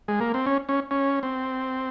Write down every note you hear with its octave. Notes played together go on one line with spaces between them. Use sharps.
G#3
A#3
C4
C#4
C#4
C#4
C4